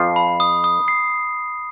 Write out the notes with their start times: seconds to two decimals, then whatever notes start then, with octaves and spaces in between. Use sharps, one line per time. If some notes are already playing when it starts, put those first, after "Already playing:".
Already playing: F2 F3 C7
0.16 B5
0.40 D#6
0.64 D#6
0.88 C7